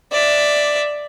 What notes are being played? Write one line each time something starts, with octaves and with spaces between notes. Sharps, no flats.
D5 E5